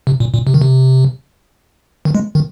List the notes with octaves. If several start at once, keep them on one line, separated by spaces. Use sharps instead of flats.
C3
A#2
A#2
C3
D#3
C3
D#3
G#3
D#3